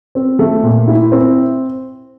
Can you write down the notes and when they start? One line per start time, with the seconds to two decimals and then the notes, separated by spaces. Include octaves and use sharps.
0.15 C4
0.39 A3
0.63 A#2
0.87 E4
1.12 C4